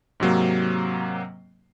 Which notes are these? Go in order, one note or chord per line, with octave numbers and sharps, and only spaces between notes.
G#2 C3 F#3 A#3